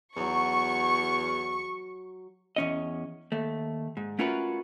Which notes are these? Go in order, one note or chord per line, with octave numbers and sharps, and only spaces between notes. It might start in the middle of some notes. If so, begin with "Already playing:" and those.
E2 F#3 C#5 C#6
E2 C#4 D#5
D#2 A3
G#2
A3 C#4 F4 F#4 A#4 B4